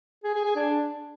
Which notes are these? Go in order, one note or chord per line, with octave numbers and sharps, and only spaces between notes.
G#4
G#4
G#4
D4